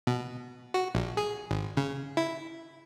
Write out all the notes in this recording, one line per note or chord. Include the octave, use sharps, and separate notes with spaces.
B2
F#4
A#1
G#4
G#1
C#3
E4